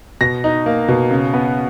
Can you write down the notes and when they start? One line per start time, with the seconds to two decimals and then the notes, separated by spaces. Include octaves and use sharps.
0.21 B2 A#6
0.44 D#4
0.66 A#3
0.88 B2
1.11 C#3
1.33 B3